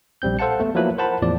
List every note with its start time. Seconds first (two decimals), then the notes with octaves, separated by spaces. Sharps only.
0.22 A#1 G3 C4 G6
0.39 A4 C5 F5 F#5 A5 C#7
0.60 A3 B3
0.75 F3 F#3 A#3 E4 B4
0.98 A#4 C5 F#5 A5 B5
1.22 E2 A2 F3 D5